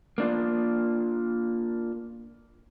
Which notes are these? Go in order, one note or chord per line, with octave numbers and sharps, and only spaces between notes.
A#3 D4 F4